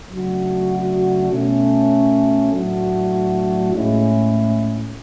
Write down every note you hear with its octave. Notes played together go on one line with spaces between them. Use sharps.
C#3 F#3 A3 D4 F#4
B2 A3 C#4
A2 F#3 A3 D4 F#4
A2 G#3 C#4 E4